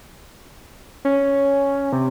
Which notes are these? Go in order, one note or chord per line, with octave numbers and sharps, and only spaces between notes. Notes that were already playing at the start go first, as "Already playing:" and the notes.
C#4
C3